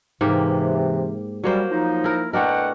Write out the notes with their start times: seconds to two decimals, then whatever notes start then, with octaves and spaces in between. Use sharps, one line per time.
0.21 G#2 C3 E3 A#3 G4
1.44 F#3 G3 A#3 C5
1.71 F3 D#4
2.04 E4 A#4
2.33 B2 A3 D4 A#4 F#5 G5